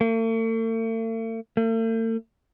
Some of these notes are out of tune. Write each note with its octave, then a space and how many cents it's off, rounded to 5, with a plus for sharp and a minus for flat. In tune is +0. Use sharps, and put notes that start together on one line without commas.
A3 +45
A3 +45